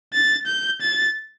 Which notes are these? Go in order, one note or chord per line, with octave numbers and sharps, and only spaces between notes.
A6
G6
A6